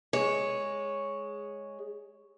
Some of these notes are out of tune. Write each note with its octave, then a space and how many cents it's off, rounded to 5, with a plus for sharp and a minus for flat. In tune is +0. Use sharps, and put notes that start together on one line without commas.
G#3 +0 C#5 +0